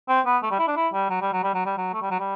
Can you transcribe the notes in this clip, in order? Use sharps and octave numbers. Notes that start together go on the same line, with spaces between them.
C4
B3
A3
G3
E4
D4
E4
G3
F#3
G3
F#3
G3
F#3
G3
F#3
A3
G3
F#3
G3